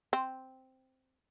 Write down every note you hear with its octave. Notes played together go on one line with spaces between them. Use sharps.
C4